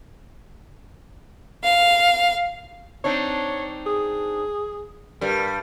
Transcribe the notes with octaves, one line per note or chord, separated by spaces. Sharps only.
F5
C4 D4 D#4 C#5
G#4
G2 G3 A#4